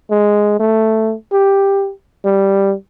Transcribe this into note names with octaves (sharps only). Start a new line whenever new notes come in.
G#3
A3
G4
G3